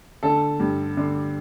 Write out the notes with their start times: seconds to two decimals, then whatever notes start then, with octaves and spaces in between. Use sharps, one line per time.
0.23 D3 A4
0.60 G2
0.97 D3